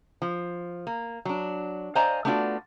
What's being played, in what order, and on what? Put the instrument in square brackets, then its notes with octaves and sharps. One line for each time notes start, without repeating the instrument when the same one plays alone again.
[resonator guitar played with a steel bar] F3
A#3
F#3 D4
C5 D5 D#5 F5 G#5 A#5
A3 B3 D4 F4 F#4 D5